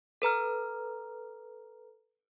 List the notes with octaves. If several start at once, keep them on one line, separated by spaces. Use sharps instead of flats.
A4 B4 A#5 F6